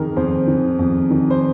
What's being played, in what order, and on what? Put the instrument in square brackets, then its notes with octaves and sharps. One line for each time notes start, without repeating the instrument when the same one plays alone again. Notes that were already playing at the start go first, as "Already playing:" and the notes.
Already playing: [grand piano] F2 D#3 G#4 A#4
F2 C5
D#3
F2
D#3
C5